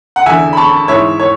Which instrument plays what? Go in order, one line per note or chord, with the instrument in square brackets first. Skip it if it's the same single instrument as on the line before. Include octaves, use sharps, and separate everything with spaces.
[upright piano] F#5
E2 D3 E5 G#5
B5
A5 C#6
G#2 E3 C#5 E5
C#5